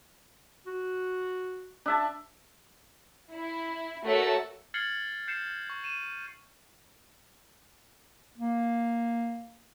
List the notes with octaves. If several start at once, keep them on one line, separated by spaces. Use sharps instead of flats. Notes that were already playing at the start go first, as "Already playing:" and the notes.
F#4
D4 E5 A5
E4
A3 F#4 A#4 C#5 A5 E6
F6 G#6 A6 C7 C#7 F#7
G6 C7 C#7 E7
C#6
D#7 E7
A#3